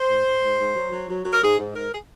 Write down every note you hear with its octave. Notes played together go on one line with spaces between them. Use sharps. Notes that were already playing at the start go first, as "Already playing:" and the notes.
Already playing: C5
G#2
G#2
G#2
G#2
F#3
F#3
F#3
F#3
A#4
G#2 G#4
G#2
G#2 A#4
G#4